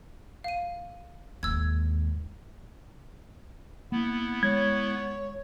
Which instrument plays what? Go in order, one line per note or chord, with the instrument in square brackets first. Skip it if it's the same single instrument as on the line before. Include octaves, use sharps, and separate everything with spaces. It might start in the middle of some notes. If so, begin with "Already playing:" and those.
[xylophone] F5 D#7
[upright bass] D#2 G#2 [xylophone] E6 G#6
[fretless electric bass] A#3 [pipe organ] B3 E4
[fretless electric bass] G#3 [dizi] C#5 [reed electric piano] G#6